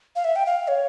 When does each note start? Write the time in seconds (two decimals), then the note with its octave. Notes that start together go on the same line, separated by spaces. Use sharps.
0.16 F5
0.24 E5
0.36 G5
0.46 F5
0.68 C#5